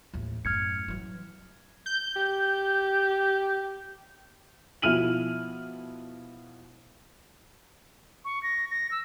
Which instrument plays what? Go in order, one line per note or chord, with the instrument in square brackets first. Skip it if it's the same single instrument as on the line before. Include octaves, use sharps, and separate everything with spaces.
[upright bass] A1 D#2
[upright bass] F#2 A2 [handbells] F6 G#6 C#7
[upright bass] E3 F#3
[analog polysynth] G6
[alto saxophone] G4
[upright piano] B2 F3 E4 F6 D#7 F#7
[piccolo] C#6
A#6
A#6
E6